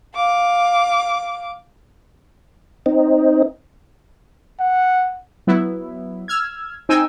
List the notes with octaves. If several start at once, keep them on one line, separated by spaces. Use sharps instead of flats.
F5 D6
C4 D#4
F#5
F#3 B3 E4
E6 F6 G#6
C4 D#4 G5 G#5 E6